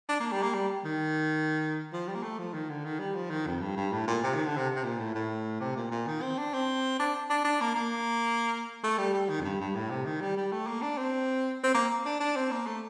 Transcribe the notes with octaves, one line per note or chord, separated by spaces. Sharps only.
D4
A#3
G3
A#3
G3
D#3
F3
G3
A#3
A3
F3
D#3
D3
D#3
G3
F3
D#3
F2
G2
G2
A2
A#2
C3
D#3
D3
C3
C3
A#2
A2
A2
C3
A#2
A#2
D#3
C4
D4
C4
D4
D4
D4
A#3
A#3
A3
G3
G3
D#3
F2
G2
G2
A2
C3
D#3
G3
G3
A3
A#3
D4
C4
C4
A#3
D4
D4
C4
A#3
A3